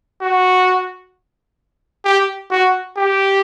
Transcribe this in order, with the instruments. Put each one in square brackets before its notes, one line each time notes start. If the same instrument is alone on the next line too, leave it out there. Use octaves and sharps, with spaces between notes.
[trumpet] F#4
G4
F#4
G4